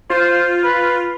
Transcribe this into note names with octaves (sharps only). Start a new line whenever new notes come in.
F4 C5
B4